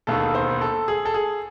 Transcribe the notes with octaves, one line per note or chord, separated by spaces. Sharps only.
E1 D#2 D#3 A4
C5
A4
G#4
A4
G#4